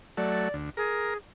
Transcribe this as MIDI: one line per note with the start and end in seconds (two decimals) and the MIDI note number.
0.17 0.49 54
0.17 0.49 57
0.17 0.54 74
0.54 0.70 38
0.77 1.17 68
0.77 1.14 70